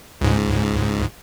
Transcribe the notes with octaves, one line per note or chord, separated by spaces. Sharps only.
C#2 G#2